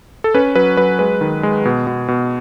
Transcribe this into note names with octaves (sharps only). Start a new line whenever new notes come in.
A4
C#4 B4
F#3 B4
F#3 B4
G#3 B4
D#3
G#3
B2
B2
B2